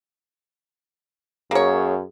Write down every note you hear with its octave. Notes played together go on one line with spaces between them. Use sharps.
F#2 A#3 G#4 C#5